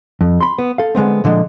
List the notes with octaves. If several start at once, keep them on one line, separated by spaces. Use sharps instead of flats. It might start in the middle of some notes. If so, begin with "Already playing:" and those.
F2
B5 C6
B3
A4 F5
D3 G#3 B3 C4
A#2 D3 F3 G#3